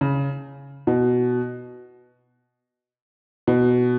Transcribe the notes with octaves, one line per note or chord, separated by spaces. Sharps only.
C#3
B2
B2